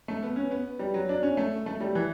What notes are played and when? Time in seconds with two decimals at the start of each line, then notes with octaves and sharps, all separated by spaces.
0.08 A3
0.23 B3
0.36 C#4
0.51 B3
0.79 G3
0.94 F#3
1.09 D4
1.23 C#4
1.37 A3
1.66 A3
1.81 G3
1.95 E3